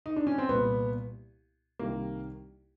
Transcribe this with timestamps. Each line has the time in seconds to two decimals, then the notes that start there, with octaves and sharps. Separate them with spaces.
0.06 D#4
0.16 D4
0.27 C#4
0.38 C4
0.48 C2 A#2 B3
1.79 C2 C3 D#3 A#3